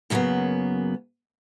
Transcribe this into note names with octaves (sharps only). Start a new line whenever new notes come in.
F#2 C#3 F#3 G#3 A#3 B3